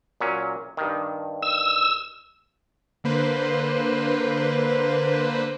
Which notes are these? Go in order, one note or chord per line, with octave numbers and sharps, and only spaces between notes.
A#2 F#3 C#4
G2 D#3
E6
D3 A#3 B4 C5